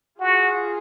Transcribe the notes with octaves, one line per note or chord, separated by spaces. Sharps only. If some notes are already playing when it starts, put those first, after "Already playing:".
F4 F#4 G#4